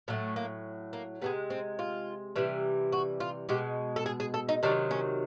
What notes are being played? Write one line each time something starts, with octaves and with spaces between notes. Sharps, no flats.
A2 F#3 A3 A#3
A#3
A#3
C3 E3 G#3 B3
C4
F4
C3 E3 G3
F#4
F4
B2 G#3 G4
A4
G#4
G#4
A4
D#4
C3 D#3 F#3 D4
C#4